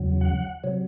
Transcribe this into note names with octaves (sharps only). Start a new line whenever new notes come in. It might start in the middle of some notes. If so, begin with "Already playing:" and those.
Already playing: E2 C#3 F#3
F#5
C3 F#3